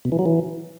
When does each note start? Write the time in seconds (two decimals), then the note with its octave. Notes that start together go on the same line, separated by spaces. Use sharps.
0.05 B2
0.12 E3
0.19 F#3
0.26 E3